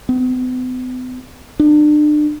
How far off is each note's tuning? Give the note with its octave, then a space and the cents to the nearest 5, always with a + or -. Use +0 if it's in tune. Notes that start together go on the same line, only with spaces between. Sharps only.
B3 +45
D4 +35